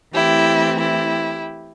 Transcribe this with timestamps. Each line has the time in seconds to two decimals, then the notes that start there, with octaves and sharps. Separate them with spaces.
0.14 E3 A3 C4 E4 G4
0.80 E4 G4